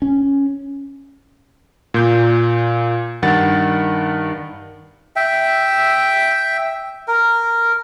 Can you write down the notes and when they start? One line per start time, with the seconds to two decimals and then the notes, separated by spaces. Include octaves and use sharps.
0.02 C#4
1.94 A#2 G6
3.22 G2 D#3 F#5 A6
5.16 E5 G5
7.08 A#4